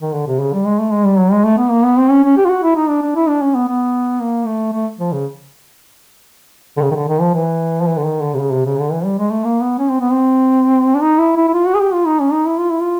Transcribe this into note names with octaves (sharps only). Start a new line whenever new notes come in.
D#3
D3
C3
C#3
G3
G#3
A3
G#3
G3
F#3
G#3
A3
B3
A#3
B3
C4
C#4
C#4
G4
F4
F#4
E4
D#4
D4
D4
E4
D4
C#4
B3
B3
A#3
A3
A3
F3
C#3
D3
C#3
D#3
D3
D#3
F3
E3
F3
E3
D3
D#3
D3
C3
C#3
C3
C#3
D3
E3
G3
G#3
A3
A#3
B3
C#4
C4
B3
C4
D4
D#4
E4
E4
E4
F4
F#4
G#4
G4
F4
D#4
C#4
D#4
E4
F4
E4
F4